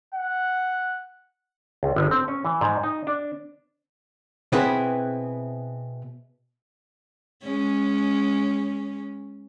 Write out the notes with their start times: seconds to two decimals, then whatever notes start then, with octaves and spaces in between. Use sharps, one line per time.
0.15 F#5
1.83 C#2
1.96 G1
2.11 C4
2.28 C#4
2.45 E3
2.61 G#2
2.83 D#4
3.07 D4
4.52 B2 B3 C4 E4 G#4 B4
7.43 G#3 C#4